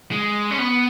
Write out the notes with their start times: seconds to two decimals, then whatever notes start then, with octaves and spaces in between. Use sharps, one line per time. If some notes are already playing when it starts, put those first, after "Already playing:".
0.11 G#3
0.51 C#4
0.58 B3